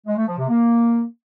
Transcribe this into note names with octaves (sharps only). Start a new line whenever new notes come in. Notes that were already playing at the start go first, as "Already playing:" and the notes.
G#3
A3
F3
C3
A#3